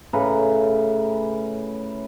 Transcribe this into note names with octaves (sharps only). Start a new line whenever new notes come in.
A2 C#3 B4 A#5